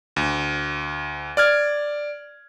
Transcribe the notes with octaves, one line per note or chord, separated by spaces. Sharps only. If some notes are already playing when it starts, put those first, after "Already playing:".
D2
D5 F6 G#6